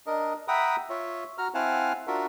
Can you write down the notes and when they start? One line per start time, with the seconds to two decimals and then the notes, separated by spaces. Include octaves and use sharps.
0.07 D4 A#4 D#5
0.48 E5 F#5 G5 A#5 B5 D#6
0.90 F4 C#5 E5
1.38 F#4 A#5 F6
1.54 C4 E4 F5 F#5 G#5 A5
2.07 D4 F4 F#4 A#4 E5